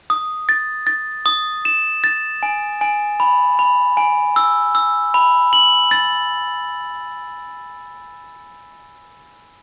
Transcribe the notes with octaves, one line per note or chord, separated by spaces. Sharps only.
D#6
A6
A6
D#6
E7
A6
G#5
G#5
B5
B5
G#5
E6
E6
B5
F#7
A6